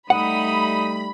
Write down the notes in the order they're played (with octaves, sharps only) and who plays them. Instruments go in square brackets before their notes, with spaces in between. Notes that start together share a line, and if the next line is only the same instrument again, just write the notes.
[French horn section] G3 A3 [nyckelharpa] D#4 D#6 [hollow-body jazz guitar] F#5 [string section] B5